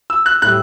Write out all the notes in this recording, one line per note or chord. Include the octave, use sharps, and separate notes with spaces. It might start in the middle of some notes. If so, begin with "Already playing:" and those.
E6
F#6
A2 G3 F#6